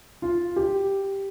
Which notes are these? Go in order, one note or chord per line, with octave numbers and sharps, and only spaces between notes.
F4
G4